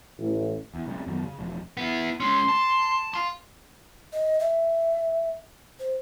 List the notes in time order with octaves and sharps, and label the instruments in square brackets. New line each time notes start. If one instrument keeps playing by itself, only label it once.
[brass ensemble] A1
[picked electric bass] E2
B1 C#3 G#3 C4
F#2 D#3 F#3 B3
C#3
E1 F3
[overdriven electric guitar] B3 E4
[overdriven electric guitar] G#3 C#4 [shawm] C6
[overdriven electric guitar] A5
F5 C6
[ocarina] D#5
E5
C5